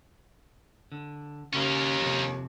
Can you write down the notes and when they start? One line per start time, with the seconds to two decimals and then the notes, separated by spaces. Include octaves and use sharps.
0.92 D3
1.53 D#2 C#3 C#4 A#4
2.01 F2 C3